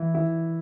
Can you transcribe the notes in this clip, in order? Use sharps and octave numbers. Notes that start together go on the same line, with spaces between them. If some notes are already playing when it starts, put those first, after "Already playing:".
Already playing: E3 E4
E3 E4